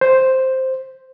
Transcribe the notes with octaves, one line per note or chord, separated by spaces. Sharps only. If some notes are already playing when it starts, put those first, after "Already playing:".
C5